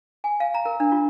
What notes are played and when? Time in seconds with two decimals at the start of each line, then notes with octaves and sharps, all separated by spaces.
0.24 G#5
0.40 F5
0.54 A#5
0.66 A#4
0.80 D4
0.92 F4